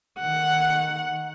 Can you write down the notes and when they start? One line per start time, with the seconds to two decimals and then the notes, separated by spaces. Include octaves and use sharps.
0.20 D#3 F#5